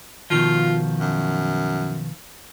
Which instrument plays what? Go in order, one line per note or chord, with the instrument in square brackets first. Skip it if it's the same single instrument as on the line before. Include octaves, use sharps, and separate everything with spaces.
[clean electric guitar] B2 D#3 F3 [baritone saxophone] F4
[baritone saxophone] F#2